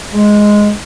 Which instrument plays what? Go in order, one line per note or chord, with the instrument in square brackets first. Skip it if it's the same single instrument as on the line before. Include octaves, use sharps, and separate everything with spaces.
[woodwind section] G#3